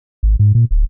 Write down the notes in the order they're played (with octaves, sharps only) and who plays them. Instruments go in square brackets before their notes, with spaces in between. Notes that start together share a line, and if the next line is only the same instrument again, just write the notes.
[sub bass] G#1
G#2
A#2
D1